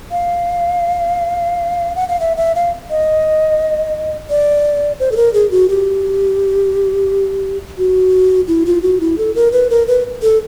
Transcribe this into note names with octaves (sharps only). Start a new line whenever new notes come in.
F5
F#5
F5
E5
E5
F5
D#5
D5
C5
A4
A#4
G#4
F#4
G4
F#4
E4
F4
F#4
E4
A4
A#4
B4
A#4
B4
A4